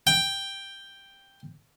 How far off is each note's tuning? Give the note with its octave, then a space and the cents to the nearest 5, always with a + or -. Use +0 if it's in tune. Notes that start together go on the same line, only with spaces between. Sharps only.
G5 +5